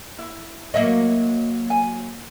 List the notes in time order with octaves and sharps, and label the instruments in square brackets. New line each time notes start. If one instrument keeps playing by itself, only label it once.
[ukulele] E4
[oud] F#3 A#3 [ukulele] D#5 E5
[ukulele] G#5